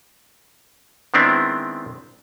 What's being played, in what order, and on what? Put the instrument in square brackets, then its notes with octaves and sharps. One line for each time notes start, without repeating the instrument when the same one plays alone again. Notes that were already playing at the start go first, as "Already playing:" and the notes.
[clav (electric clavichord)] D#3 G#3 B3 C4 D4 E4